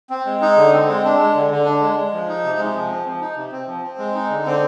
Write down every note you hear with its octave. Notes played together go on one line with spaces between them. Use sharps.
C4
G#3
D#4
D3
C4
G#3
D4
G#3
D3
D3
D4
G#3
G#3
F3
D#4
C3
G#3
F3
C4
F3
D#4
C3
C4
F3
C4
G#3
D#4
D3
C4